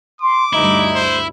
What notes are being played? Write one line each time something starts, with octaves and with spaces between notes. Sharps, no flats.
C6 D6
D2 G2 D#4 E4
C5